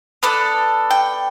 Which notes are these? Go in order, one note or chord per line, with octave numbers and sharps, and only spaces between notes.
B3 D4 A4
G5